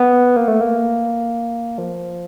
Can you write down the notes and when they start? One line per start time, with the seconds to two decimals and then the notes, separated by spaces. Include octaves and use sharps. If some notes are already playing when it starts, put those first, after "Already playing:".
Already playing: B3
0.36 A#3
0.48 A3
0.61 A#3
1.78 F3